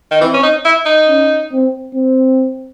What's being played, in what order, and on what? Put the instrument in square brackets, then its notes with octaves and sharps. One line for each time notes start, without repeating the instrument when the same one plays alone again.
[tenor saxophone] D#3
[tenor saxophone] E3 [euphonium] C4
[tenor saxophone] C#4
D#4
E4
D#4
[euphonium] C#4
C4
C4